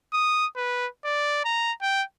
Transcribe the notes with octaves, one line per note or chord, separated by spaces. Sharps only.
D#6
B4
D5
A#5
G5